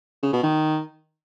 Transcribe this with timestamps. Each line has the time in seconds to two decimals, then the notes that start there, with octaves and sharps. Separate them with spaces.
0.23 C#3
0.33 B2
0.43 D#3